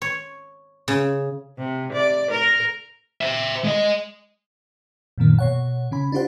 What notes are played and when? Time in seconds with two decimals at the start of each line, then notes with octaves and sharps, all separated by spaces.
0.02 C#5
0.88 C#3
1.58 C3
1.92 D5
2.31 A#4
3.21 C5 E5
3.65 G#3 D#5
5.18 F#2 A#2 D#3 A#3
5.39 B2 C#5 F#5
5.91 C#3 C#4 B5
6.12 D4 E4 F4 G4 C5 F#5